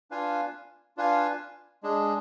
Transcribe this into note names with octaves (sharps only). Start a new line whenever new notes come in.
D4 F4 B4 F5 G#5
D4 F4 B4 F5 G#5
G#3 D4 G#4